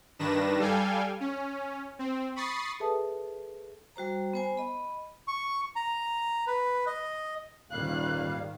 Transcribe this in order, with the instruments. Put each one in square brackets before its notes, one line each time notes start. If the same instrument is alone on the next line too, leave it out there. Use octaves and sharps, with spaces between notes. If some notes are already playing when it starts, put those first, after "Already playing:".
[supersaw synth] G2 D#3 D4 B4 A#6 E7
G3 A4 F5 G5 G#5
C#4
C4
B5 C#6 D#6 A6 C7
[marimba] G#4 A4 B4 E5 A5 D#6
[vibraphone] G3 F#4 C5 A#5
B3 C5 G#5
D#5 B5
[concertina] C#6
A#5
B4
D#5
[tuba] D#1 [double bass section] G#2 D#3 [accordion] G3 A#3 F5 [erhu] F#6